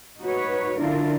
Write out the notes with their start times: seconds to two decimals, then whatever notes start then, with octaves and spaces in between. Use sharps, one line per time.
0.20 D#4 F#4 B4 C#5
0.79 D3 C#4 D4 E4 F4 A#4